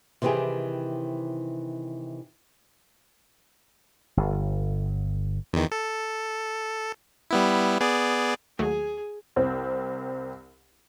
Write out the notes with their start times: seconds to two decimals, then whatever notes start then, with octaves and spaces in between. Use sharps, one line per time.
0.22 C3 D#3 E3 E4 G4 G#4
4.17 G1
5.53 E2 D#3
5.71 A4
7.31 G3 B3 E4
7.80 B3 G#4 D5
8.59 D#2 F#3 A3 G#4
9.36 C2 C4 C5